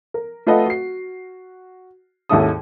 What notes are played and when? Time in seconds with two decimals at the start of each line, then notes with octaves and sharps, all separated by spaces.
0.14 A#4
0.47 A3 F4 A4 B4 D#5 F#5
0.66 F#4 C7
2.29 D#2 G#2 C#4 E4 A4 D#6